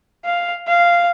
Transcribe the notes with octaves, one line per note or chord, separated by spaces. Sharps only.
F5
F5